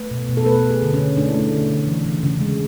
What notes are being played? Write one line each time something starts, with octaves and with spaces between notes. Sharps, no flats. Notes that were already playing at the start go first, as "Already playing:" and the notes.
Already playing: A3 B4
B2
B2
A4
A3 B4
A3
G#4
D3
C#4
D3
A3 D4
E4
A3
D4
D3
D3
E3
C#3
C#3
G#3